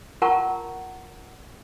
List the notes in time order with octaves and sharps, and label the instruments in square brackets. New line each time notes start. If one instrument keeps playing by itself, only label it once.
[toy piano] F4 A#4 F#5 A5 A#5 C#6